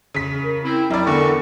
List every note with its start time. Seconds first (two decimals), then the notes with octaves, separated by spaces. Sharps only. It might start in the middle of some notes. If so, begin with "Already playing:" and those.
0.14 C#3 B6
0.43 A#4
0.64 C4 E4
0.90 F#3 G3 E4 D5
1.07 E2 D3 C#6